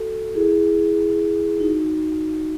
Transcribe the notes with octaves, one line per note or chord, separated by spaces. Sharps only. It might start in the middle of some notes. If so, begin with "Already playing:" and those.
Already playing: F#4 A4
E4 G#4
D#4 F#4